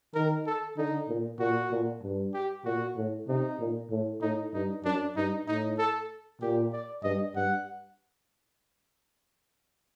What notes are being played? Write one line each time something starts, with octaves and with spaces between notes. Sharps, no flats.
D#3 A#4
A4
D3 D#4
A#2
A#2 F#4
A#2
G2
G4
A#2 F#4
A2
C3 D#4
A#2
A2
A2 D#4
G2 D#4
F#2 D4
G2 D#4
A2 D#4
A4
A#2 G4
D5
G2 D#5
G2 F#5